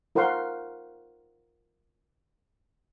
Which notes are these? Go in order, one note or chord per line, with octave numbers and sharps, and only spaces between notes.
F4 A#4 C5 F5 F#5 C6